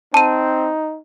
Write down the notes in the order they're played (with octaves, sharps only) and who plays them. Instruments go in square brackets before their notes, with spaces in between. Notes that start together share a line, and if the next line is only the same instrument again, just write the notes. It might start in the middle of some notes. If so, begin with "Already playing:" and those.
[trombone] C4 [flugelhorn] D#4 [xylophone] A5 D#7